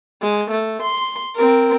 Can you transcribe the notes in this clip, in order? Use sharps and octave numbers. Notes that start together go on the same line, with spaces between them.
G#3
A3
C6
C4 A#4